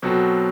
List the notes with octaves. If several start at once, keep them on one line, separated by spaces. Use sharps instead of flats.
B2 F#3 C4 F#4 A4